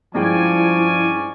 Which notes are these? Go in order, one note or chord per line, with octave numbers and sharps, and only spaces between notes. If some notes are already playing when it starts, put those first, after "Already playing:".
G2 F3 G#3 C#4 E4 D5 G5 G#5